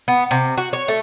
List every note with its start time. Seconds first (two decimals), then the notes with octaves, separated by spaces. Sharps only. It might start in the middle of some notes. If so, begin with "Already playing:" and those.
0.08 B3
0.31 C3
0.58 F#4
0.73 C#5
0.88 A3